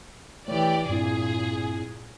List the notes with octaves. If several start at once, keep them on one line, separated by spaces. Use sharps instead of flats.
E3 A3 G4 C#5 D5
G2 A#2 C4 E4 G#4